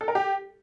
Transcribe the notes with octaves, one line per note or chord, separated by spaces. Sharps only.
A4
A#4
G4